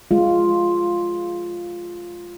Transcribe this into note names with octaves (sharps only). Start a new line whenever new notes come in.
G#3 F4